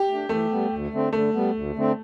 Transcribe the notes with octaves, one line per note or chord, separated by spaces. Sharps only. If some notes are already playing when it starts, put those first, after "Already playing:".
Already playing: G4
A3
D4
E3 A3
G3 B3
D2
D3 A3 C4
D3 A3
G3 B3
D2
D3 A3 C4